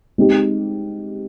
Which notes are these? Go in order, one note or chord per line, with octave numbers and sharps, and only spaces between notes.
G#3 C4 D#4 G4